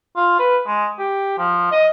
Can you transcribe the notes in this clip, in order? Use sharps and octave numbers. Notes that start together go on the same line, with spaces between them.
F4
B4
G#3
G4
F3
D#5